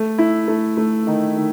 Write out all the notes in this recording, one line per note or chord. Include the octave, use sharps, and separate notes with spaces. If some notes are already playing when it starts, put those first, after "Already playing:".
Already playing: A3
E4
A3
A3
D#3
D#3